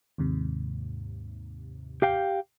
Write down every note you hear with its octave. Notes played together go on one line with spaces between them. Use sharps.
D#2 G#2 C3
G4 F5 G5